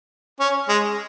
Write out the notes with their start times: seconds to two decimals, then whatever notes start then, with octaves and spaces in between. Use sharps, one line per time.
0.40 C#4
0.69 G#3